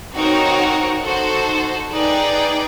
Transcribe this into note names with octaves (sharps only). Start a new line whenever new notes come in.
C4 D#4 F#4 A#4 C#5
D#4 F#4 A4 C5
D#4 G#4 B4 D5 G5